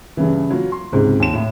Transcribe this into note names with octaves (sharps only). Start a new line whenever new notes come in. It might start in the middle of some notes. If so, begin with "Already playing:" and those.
G2 C#3 E3
F#3 F4
C6
C#2 G#2 C3
D#2 E7
A2